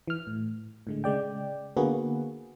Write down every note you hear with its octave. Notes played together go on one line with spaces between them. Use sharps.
E3 F6
A2
A2 D3 G#3
C#3 G#3 D5 G5
D3 A#3 B3 F#4 G#4 B4